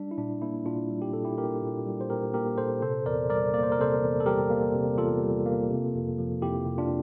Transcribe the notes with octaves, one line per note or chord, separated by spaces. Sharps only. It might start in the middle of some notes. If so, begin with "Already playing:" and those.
Already playing: G3 D4
E4
A#2 D4
A#3 E4
A#2 D4 F4
G3
G4
A#2 A4
E4 G4
A#3 G4 A#4
A#2
G3
C5
A#2 G4 A#4
A#3 G4 A#4
A#2 A4 C5
C3 A4 C5
E2 A#4 D5
G3 A#4 D5
A#3 D5
C5
A#4
C3 A4 C5
E2
A4
G3 G4 A#4
A#3
C3
E2 F4 A4
G3
A#3
C3
F2
F3
F2 E4 G4
C3
D4 F4